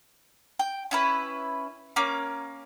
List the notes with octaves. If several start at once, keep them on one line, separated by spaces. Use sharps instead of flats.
G5
C#4 E4 B4
A#3 C#4 D6